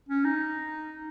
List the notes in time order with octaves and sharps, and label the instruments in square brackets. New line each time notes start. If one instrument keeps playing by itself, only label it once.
[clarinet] C#4
D#4